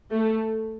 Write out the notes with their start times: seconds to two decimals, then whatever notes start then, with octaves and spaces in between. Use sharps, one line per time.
0.10 A3